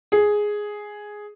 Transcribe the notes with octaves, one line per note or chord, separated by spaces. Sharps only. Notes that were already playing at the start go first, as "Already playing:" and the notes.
G#4